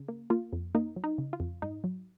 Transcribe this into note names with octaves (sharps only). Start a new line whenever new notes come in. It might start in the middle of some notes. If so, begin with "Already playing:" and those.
Already playing: C#3
A#3
A#3 F4
F2
A#3 D#4
F#3
D#4
C#3
F4
F2
G#2 D#4
F#3